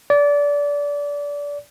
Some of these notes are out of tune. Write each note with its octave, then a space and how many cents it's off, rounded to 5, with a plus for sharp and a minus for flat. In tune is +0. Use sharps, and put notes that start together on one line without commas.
D5 -25